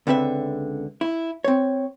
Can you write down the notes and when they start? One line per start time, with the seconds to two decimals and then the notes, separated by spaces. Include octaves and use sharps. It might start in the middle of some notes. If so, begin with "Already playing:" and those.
0.07 C#2 D3 C4 B4 E5
1.01 E4
1.44 C4 C#5